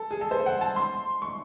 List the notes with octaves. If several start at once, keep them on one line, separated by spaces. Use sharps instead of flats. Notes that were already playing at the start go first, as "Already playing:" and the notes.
Already playing: A4
G#4
A4
C5
F#5
A5
C6
C#6